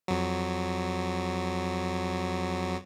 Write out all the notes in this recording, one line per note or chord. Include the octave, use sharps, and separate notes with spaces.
F2 F#3